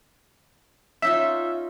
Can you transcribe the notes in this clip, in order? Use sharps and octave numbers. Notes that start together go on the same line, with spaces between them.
C#4 D#4 F4 E5